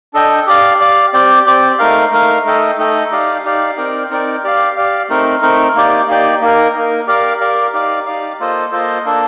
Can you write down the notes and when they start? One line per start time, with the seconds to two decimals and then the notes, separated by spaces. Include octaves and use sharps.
0.14 D4 A4 D#5 G5
0.47 G4 D5 F5
0.80 G4 D5 F5
1.13 C4 G4 D5 G5
1.46 C4 G4 D5 G5
1.79 A3 D#4 A#4 F5
2.12 A3 D#4 A#4 F5
2.44 A3 D#4 A4 D#5 G5
2.78 A3 D#4 A4 D#5 G5
3.11 D#4 G4 D5 F5
3.43 D#4 G4 D5 F5
3.77 C4 D#4 A#4 D5 G5
4.10 C4 D#4 A#4 D5 G5
4.44 G4 D5 F5
4.76 G4 D5 F5
5.09 A3 C4 D#4 A#4
5.42 A3 C4 D#4 A#4
5.75 A#3 D#4 G4 D5 G5
6.08 A#3 D#4 G4 D5 G5
6.42 A#3 D#4 A#4
6.74 A#3 D#4 A#4
7.07 G4 A#4 D5 F5
7.41 G4 A#4 D5 F5
7.73 D#4 G4 D5 F5
8.06 D#4 G4 D5 F5
8.40 A#3 F4 A4 C5 D#5
8.72 A#3 F4 A4 C5 D#5
9.05 A#3 D4 A4